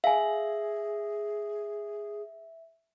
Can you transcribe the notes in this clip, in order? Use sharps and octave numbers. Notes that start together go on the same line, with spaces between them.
G#4 E5 F5 G#5